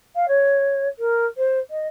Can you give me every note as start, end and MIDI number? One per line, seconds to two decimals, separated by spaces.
0.15 0.26 77
0.28 0.88 73
0.99 1.26 70
1.38 1.60 72
1.71 1.87 75